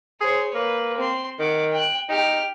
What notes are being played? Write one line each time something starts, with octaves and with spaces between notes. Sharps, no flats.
G#4 C5 C#5
A#3 B4
C4 C6
D#3 F#5 D6
G5 F#6
D#4 G4 F6